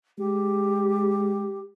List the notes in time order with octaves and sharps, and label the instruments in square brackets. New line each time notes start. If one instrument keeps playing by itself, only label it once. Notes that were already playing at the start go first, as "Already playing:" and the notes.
[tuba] G#3 [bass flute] G4